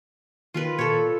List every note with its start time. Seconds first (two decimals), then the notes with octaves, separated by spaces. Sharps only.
0.54 D#3 F4 A#4 B4
0.78 A#2 A4 C#5